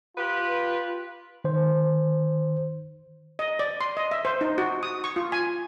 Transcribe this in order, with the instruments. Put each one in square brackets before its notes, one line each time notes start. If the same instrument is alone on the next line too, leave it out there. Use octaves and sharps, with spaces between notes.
[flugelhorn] F4 [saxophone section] G4 B4
[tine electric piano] D#3 C5
[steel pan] D#5
D5
C6
D#5
E5
C5
D#4
F#4
D#6
C#6
F4
G#5